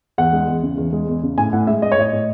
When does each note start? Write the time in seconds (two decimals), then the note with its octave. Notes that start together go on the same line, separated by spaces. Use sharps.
0.18 E2 F#5
0.33 G#3
0.48 E2
0.63 C#3
0.78 E2
0.93 G#3
1.08 E2
1.23 C#3
1.38 A2 G#5
1.53 A2 F#5
1.67 G#3 E5
1.82 G#3 D#5
1.92 C#5
1.98 A2 D#5
2.12 A2